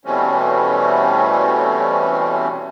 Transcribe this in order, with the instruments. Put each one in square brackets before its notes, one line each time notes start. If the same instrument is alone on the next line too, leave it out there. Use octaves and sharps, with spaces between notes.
[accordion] B2 E3 G3 A3 C4 C#4